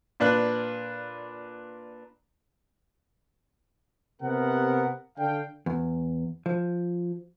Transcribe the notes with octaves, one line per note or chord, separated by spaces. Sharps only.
A#2 D4 B4 F#6
C3 B3 A#4 F#5
D3 D4 A4 F5 G5
E2
F3